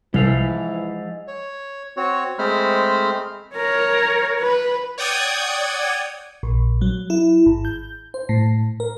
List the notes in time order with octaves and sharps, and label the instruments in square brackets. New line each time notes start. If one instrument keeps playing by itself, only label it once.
[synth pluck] C2 [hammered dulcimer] G#2 E5 [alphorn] E3 [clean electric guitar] F3 F5
[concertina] C#5
C4 F#4 C#5
G#3 A3 C4 C5 B5 F6
[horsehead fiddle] A#4 C#5
B4
[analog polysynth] C#5 D5 F#5 G5 D#6 G#6
[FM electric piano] A#1
F#3
E4
G#1
G6
C5
A2
A#4